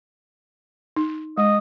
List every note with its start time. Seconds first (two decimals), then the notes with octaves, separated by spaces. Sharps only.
0.96 D#4
1.38 G#3 D#5